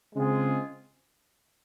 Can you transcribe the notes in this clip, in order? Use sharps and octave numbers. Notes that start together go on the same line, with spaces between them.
C#3 G#3 C4 F4 G#4